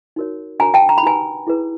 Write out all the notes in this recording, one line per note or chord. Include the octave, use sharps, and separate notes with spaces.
D#4 F#4 A#4 C#5
D4 F#4 A#4 C#5 G#5 A#5
G5 A5
A#5
B5
D#4 G4 B4 G#5 A#5
E4 G#4 B4